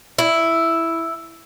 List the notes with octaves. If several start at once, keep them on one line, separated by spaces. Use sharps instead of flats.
E4